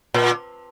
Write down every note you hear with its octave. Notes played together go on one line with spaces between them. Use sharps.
A#2